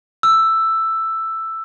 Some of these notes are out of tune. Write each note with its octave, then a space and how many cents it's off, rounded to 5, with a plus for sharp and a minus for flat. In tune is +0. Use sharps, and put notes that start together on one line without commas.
E6 +5